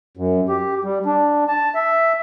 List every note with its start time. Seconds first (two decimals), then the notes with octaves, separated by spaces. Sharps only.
0.17 F#2
0.49 G4
0.84 G3
1.06 D4
1.49 A5
1.75 E5